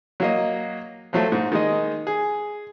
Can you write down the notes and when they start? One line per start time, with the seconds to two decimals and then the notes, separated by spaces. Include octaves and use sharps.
0.20 F#3 A#3 D#5
1.13 F3 F#3 A3
1.32 G#2
1.52 D#3 G#3 D#5
2.07 G#4